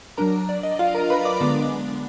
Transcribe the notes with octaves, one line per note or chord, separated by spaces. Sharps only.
F#3 D4 A#4 A#5
D5
D#5
F4 F5
A#4 A#5
B4 B5
D5 D6
D3 G#3 B3 D4